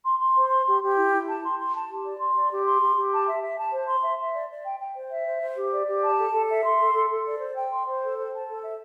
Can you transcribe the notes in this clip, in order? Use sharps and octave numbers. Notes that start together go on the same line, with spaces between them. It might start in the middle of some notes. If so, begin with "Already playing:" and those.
C6
C6
C5
C6
G4
G4
E4
E4
A5
C6
C6
A5
G4
D5
C6
D5
G4
C6
G4
G4
A5
E5
E5
A5
C5
C6
E5
E5
D5
D5
G5
G5
C5
E5
C5
C5
G4
D5
G4
A5
A4
A4
E5
C6
A4
A4
A4
D5
C5
G5
C6
C5
A4
C5
A5
A4
E5